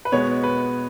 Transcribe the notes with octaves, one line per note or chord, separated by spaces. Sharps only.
B4
B2 G#3 B3 C#5
B4